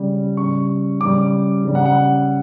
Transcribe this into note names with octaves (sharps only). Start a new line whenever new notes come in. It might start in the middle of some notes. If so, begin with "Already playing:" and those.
Already playing: C#3 G3
C#3 G3 C#6
C#3 G3 D6
C#3 G3
F#5
F#5